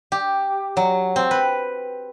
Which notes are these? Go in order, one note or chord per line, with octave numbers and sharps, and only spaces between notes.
G4
F#3
C4
B4